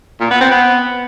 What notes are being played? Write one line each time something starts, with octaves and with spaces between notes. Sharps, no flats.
A#2
B3
C4
B3